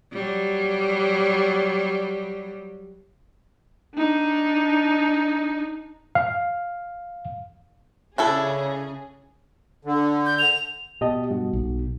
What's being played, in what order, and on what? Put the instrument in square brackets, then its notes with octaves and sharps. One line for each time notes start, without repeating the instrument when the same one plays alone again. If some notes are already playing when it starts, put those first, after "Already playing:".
[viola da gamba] F#3 G3
[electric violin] D4 D#4
[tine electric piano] F5
[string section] C#3 C#4 G#4 [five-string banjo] D4 E4 A4
[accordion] D3
[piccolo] G6
F7
[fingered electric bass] B2 [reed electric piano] G4 D#5 A5
[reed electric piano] G2 F#4
[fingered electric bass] B1